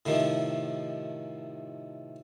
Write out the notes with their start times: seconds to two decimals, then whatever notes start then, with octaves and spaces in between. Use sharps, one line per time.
0.06 A2 C3 D#3 F3